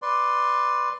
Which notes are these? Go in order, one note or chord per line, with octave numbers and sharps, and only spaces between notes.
B4 D5 C6